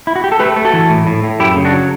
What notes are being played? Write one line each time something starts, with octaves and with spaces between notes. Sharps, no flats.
E4
F#4
G4
A4
A3 G4 B4
A3
F#4 A4
E3
A2
A2
A2
F#2 E4 G4
C#3
D4 F#4
F#3